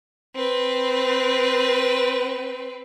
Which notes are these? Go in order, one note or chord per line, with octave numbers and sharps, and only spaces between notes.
C4 B4